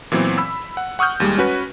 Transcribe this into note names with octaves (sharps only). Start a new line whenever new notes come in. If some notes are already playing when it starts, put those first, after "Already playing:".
A#2 E3 F#3 B3 C4
B5 E6
F#5
F#5 C#6 D#6 F6 G6
D#2 G3 G#3
C#4 F#4 B4